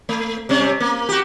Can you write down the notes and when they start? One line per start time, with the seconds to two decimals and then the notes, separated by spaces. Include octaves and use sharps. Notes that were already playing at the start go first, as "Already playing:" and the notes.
0.09 A3
0.49 C3 G3 C#4
0.80 A#3
1.09 F#4 G4